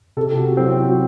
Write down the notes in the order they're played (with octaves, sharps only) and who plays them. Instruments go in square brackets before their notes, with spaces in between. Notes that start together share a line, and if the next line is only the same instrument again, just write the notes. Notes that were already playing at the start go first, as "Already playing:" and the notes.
[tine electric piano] C3 [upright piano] A4
[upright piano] G4
F#4
[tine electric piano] F#3 C4 [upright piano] E4
[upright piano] F#4